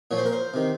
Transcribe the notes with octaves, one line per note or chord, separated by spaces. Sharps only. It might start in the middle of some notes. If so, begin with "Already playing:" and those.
A#2 F3 C#5
C5
A#4
C5
C3 D#3